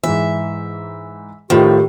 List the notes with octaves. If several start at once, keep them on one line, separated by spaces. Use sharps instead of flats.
G#2 E3 E5
A2 D#3 F3 G4